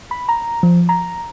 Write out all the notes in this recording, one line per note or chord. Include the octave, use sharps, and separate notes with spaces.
B5
A#5
F3
A#5